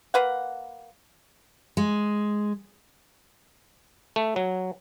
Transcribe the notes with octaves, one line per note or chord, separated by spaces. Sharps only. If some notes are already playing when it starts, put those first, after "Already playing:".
A#3 B4 F#5
G#3
A3
F#3